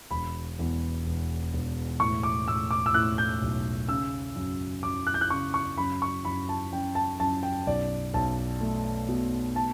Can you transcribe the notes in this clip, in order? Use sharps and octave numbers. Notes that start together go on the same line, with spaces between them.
E1 B5
E2
E1
E1
A2 C#6
D6
A2 E6
D6
E6
A2 F#6
G6
B1
C#3 E6
F#2
F#2 D6
F#6
G6
F#6
C#3 C#6
C#6
F#2 B5
C#6
F#2 B5
A5
F#2 G5
A5
F#2 A5
G5
B1 D5
B1 A5
A3
B2
A5